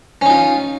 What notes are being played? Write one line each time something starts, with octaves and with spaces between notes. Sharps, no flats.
C#4 D#4 F4